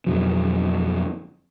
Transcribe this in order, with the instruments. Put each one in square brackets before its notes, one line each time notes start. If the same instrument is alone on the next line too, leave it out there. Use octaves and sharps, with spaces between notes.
[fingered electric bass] F2 B2 D3 F#3